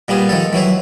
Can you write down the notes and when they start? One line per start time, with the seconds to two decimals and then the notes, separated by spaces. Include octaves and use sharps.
0.08 A#2 G3 B3 G#4
0.29 D#3 F3 A4
0.53 E3 F#3 E4 C5